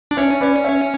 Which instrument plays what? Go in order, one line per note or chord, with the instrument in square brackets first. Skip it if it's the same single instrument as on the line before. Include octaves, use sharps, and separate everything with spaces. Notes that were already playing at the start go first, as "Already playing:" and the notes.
[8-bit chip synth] D4
[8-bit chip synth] C#4 [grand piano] C#5 E5
[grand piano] B4 D5
C#5 E5